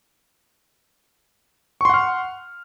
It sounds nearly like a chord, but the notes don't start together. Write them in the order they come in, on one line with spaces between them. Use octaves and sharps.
C#6 C6 F#5 F6